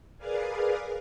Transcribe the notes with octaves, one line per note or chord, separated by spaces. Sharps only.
G#4 A#4 B4 D5 F5 G#5